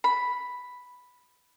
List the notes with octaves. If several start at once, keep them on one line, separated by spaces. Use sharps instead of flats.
B5